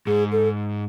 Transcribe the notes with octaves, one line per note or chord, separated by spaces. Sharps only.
G#2 G#4
A4